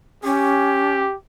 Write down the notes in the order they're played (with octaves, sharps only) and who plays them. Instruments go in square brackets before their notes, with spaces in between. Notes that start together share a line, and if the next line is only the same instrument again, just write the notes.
[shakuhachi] C#4 [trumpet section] G4